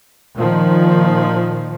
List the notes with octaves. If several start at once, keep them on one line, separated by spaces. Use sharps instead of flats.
A#2 D#3 F3